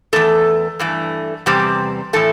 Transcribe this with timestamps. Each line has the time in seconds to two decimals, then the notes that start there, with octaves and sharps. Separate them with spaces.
0.13 C3 A3 A4
0.16 E2
0.79 G2 E3 A3
1.46 E2 C3 G3 C4 G4
2.13 A2 E3 A3 A4